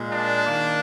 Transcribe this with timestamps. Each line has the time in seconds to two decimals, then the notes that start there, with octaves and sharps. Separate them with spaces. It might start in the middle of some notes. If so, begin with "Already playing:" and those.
Already playing: A#2 G#3
0.12 D4
0.44 D#3 A#3